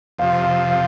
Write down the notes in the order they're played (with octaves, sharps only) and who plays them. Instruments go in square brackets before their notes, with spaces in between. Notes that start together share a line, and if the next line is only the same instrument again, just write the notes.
[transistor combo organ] F2 C3 F3 [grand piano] F5
[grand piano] F5
F5